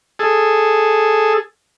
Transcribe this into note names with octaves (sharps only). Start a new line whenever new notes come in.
G#4 A4